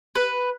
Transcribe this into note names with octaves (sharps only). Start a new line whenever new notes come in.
B4